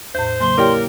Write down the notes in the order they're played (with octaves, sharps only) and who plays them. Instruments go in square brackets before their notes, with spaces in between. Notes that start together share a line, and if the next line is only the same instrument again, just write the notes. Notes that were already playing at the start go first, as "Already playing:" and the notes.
[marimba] E2 A2 [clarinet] C5 [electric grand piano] G6
[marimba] C#3 F#3 A#3 [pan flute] C6
[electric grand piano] A#3 D5 G5 [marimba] E4 G4 C#5 [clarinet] A#4